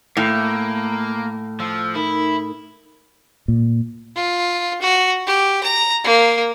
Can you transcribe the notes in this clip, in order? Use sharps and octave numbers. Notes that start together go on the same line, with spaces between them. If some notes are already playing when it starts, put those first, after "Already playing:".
A2 A#3
F3 E6
D#4 E4 A#4
A#2
F4
F#4
G4
A#5
A#3